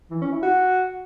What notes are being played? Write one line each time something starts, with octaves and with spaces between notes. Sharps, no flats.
E3
C#4
E4
F#4